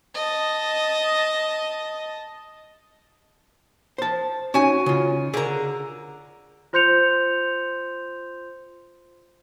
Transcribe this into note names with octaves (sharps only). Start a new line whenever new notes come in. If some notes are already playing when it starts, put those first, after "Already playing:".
D#5 A5
C5 A5
C#4 D#4 F#4 G#5
C#3 F4
D3 G#4 A#4 A#5
F4 C5 C6 G6 C#7 F7